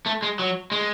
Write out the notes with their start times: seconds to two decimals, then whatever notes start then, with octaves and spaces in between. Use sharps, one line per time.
0.06 A3
0.22 G#3
0.39 F#3
0.72 G#3